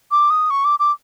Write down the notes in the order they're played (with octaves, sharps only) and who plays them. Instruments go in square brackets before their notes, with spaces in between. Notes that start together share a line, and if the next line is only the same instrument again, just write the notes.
[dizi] D6
D#6
C#6
D6
D6